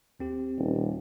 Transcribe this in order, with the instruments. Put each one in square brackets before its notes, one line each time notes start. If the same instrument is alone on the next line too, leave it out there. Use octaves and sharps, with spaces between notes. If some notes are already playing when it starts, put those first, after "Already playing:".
[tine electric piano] D#2 C4 G4
[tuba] D#1